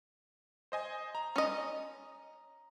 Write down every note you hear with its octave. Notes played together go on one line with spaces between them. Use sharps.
C5 D#5 G#5
A#5
C#4 D#5